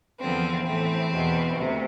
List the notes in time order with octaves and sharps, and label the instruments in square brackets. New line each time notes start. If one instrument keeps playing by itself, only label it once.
[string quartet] E2 D3 F3 B3 C4
A2 E3 A3 C4
E2 B2 B3
D2 C3